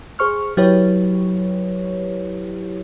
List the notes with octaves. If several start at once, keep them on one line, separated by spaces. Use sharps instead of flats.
G#4 C5 C#6 F6
F#3 E4 G4 B4 C#5